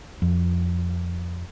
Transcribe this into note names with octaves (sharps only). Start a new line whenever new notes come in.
F2